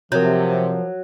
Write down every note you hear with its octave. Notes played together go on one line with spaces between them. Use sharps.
C3 F3 F#3 A#4 G6